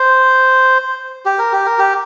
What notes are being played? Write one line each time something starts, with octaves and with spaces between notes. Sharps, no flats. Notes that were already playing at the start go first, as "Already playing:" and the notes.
Already playing: C5
G4
A#4
G4
A#4
G4